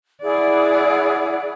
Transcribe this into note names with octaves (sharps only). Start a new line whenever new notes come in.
E4 G#4 D5 F#5